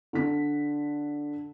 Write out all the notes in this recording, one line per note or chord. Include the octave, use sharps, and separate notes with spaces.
D3 B6